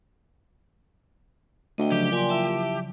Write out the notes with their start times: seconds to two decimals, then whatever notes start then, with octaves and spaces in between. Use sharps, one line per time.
1.78 D2 A3 D#5 G5
1.92 C#3 F3 F#3 G4
2.11 A#2 D5 G#5 C6
2.29 E4 E5 A5